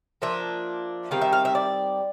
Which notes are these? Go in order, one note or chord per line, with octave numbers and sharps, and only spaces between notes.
F3 A#3 D4 E5
D#3 G3 C4 F5
E5
F5
E5
D5